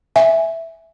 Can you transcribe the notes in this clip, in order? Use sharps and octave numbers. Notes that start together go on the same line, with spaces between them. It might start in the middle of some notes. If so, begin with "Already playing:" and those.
E5 G#5